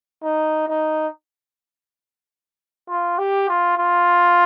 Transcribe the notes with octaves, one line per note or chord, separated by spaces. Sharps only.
D#4
D#4
F4
G4
F4
F4